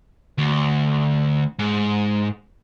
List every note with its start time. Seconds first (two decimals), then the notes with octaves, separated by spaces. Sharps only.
0.38 D2
1.59 G#2